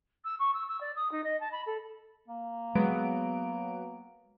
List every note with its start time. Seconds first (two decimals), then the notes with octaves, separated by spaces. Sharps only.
0.25 E6
0.39 C#6
0.54 E6
0.68 E6
0.81 D5
0.96 D#6
1.12 D#4
1.24 D#5
1.40 A5
1.52 B5
1.66 A4
2.28 A#3
2.75 F#3 G#3 B3 D7